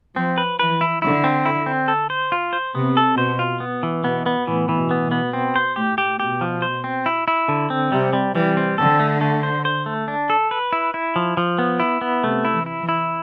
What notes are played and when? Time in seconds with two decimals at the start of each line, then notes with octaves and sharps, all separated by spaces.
0.16 F3 C4
0.38 B4
0.58 E3 B4
0.81 E4
1.02 D3 E4
1.24 C4
1.46 E4
1.66 C4
1.88 A4
2.10 C5
2.32 F4
2.53 C5
2.75 C3 B3
2.97 A4
3.17 B2 C5
3.39 F4
3.60 B3
3.83 E3
4.04 B2 B3
4.26 B3
4.47 A2 E3
4.69 E3
4.76 B2
4.91 B3
5.05 B2
5.12 B3
5.33 B2 C4
5.56 C5
5.76 A2 G4
5.98 G4
6.20 B2 G4
6.41 F3
6.62 C5
6.84 C4
7.06 E4
7.28 E4
7.48 D3
7.70 C4
7.92 C3 G3
8.13 G3
8.35 E3 G3
8.57 C4
8.78 D3 A4
9.00 A3
9.21 A3
9.43 C5
9.65 C5
9.86 A3
10.08 D4
10.30 A4
10.51 B4
10.73 E4
10.94 E4
11.16 F3
11.37 F3
11.59 B3
11.80 E4
12.01 B3
12.24 C3 A3
12.45 E4
12.52 E3
12.66 E4
12.80 E3
12.89 E4